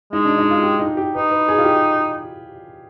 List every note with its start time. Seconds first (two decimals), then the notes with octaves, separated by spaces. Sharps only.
0.12 G#3 D#4
0.25 D4
0.38 D#4
0.51 F4
0.63 G4
0.80 D#4
0.97 G4
1.14 D#4 B4
1.30 B4
1.48 G#4
1.58 F4
1.64 G4